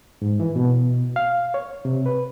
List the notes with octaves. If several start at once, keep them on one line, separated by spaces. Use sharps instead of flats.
G#2
E3
B2
F5
C#5
C3
B4